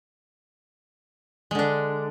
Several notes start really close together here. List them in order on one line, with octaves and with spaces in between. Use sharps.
G#3 D3 D4